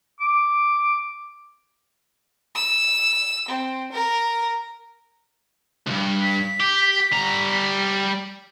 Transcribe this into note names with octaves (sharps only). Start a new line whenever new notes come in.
D6
E6
C4
A#4
C#2 G2
B6
G4
G3 A#5